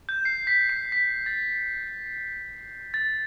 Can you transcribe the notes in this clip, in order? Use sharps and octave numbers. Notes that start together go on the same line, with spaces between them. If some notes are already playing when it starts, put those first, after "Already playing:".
G6
C7
B6
C7
B6
A6
A6